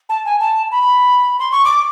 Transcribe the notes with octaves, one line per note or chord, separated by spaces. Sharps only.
A5
G#5
A5
B5
C6
C#6
D6